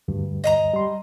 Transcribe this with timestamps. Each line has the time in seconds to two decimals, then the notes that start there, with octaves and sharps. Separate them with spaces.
0.08 D2 G2
0.44 D#5 F5 A#5
0.74 G3 C6